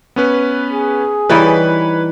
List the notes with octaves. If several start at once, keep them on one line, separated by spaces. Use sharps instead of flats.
B3 C#4 B4
G#4
E3 G3 D#4 B4 C#5 B5